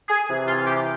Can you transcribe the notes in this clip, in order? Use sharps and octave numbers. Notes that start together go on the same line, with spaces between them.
G#4
C3 E3
F4
G4